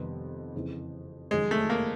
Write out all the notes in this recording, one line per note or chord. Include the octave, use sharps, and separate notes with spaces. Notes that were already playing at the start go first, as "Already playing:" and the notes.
Already playing: F2 C3 D#3 G3 B3
F#1 F2 C#3 E3
F#1 F2 C3 D#3 F#3 G#3
A3
A#3